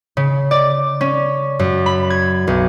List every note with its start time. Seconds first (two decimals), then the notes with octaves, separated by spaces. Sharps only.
0.17 C#3
0.51 D5
1.01 C#4
1.59 F#2
1.86 B5
2.10 G#6
2.47 B1